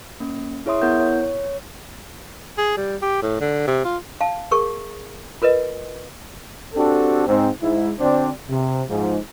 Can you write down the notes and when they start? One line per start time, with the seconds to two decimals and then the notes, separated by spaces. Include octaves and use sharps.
0.20 A#3 C#4
0.66 E4 G#4 C#5 E5 C6 D#6
0.82 B3 E4 A#4 F#5 G6
1.00 C#5
1.22 C#5
2.58 G#4
2.77 G3
3.02 G4
3.22 A2
3.40 D3
3.67 C3
3.85 F4
4.21 F5 A5
4.51 G#4 A#4 C#6
5.42 F4 A#4 B4 D#5
6.74 C4 D4 F#4 G4 A4
7.27 G#2 C4
7.62 G#2 E4
7.99 D3 C4 D4 F#4 C5 D5
8.49 C3
8.89 G#2 F3